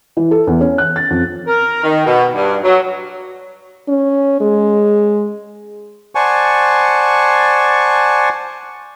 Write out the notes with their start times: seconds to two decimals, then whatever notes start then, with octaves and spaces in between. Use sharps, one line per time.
0.17 E3
0.31 A4
0.47 E2
0.61 C#4
0.78 F#6
0.96 A6
1.10 F2
1.47 A#4
1.83 D#3
2.06 B2
2.35 G2
2.64 F#3
3.88 C#4
4.41 G#3
6.15 C5 D5 F#5 G#5 A5 C#6